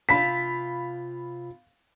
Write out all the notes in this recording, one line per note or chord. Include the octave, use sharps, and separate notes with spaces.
C3 F4 F5 A5 B5 B6